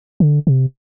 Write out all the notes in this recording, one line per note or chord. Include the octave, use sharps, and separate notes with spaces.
D3
C3